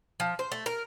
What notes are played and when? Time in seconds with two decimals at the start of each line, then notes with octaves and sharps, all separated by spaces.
0.20 F3
0.39 C5
0.52 A3
0.66 A#4